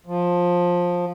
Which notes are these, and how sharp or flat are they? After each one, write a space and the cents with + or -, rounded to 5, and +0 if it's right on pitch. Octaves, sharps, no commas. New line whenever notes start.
F3 +15